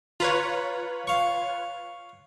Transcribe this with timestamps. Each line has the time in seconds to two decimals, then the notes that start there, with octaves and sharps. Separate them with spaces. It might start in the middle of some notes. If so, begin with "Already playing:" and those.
0.20 F4 B4 C#5 A#5 B5
1.07 F5 C#6